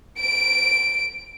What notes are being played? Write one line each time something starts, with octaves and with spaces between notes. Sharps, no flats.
D7